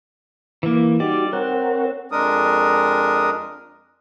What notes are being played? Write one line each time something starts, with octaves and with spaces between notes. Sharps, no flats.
E3 A#3
G3 D#4 F#4 G4 D5
C4 A#4 C#5 F#5
F2 G#3 D4 A#4 D#6